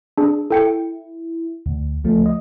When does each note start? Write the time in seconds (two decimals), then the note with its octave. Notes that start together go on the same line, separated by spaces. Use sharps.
0.18 D4 G#4
0.51 E4 A4 G5 C#7
1.66 D2
2.04 C#2 F3 A3
2.26 D#5